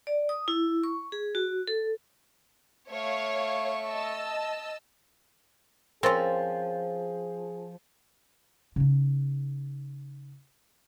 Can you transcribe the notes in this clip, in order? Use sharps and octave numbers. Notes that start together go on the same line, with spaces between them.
D5
D#6
E4
C#6
G#4
F#4
A4
A3 C#5 F5 C#6
D#5 A5 E6
F3 C4 C#4 G#4 A#4 C6 A6
C#3 D#4